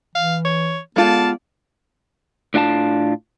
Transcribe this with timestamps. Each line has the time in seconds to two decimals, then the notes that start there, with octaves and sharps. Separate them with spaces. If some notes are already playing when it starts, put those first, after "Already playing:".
0.15 E3 F5
0.45 C#5
0.96 G#3 B3 F4 G4 A4 D5 F5 A5
2.54 A2 D4 F4 G#5 A5